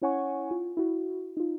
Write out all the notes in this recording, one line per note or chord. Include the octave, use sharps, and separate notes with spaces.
C#4 E4 C#5 F#5 G#5 C#6
F4
E4 F#4
D#4 F4